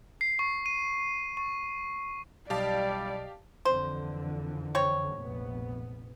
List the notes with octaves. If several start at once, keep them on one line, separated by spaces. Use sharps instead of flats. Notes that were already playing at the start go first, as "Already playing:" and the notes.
C7
C#6
D#7
C#6
B1 G3 G4 D5 D#5 F5 A5
F2 D3 E3 C5
C4 C#5
F1 A#1 B3